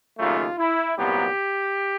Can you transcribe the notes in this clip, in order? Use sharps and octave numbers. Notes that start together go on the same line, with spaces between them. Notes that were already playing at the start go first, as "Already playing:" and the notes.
D#2 C#3 F#3 A3 F4
E4
C2 A#2 F#3 B3 G4